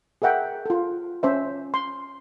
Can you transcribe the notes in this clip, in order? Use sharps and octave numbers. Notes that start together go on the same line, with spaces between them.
G#4 A#4 E5 F#5 G5
F4 A4
C#4 C5 E5
C6